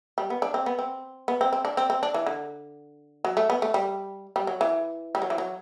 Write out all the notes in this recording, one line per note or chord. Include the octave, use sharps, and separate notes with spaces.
G3
B3
D4
C4
B3
C4
B3
C4
C4
D4
C4
C4
D4
E3
D3
F#3
A3
B3
A3
G3
G3
F#3
E3
G3
F#3
E3
F#3